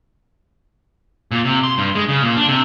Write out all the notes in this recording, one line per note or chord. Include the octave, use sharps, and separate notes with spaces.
A#2
C3
C6
G2
G#3
C#3
A#2
D4
C3